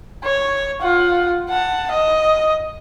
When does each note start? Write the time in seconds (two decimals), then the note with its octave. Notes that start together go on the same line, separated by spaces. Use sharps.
0.24 C#5
0.82 F4 F#5
1.49 F#5 A5
1.91 D#5